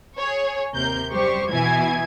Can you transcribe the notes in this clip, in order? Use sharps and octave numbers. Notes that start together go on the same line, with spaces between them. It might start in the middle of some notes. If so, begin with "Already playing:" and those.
G#4 C#5
D#2 C3 A#4 G6
F#2 G3 G4 C5 C#6
B2 E3 E4 G#5 G#6